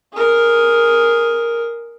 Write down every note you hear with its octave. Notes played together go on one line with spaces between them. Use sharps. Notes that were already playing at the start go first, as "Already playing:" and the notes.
G#4 A#4